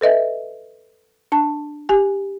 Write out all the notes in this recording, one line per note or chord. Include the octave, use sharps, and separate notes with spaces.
A4 B4 D#5 E5
D4 A5
G4 G#5